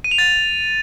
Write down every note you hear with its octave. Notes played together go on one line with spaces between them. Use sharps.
D#7
F7
A6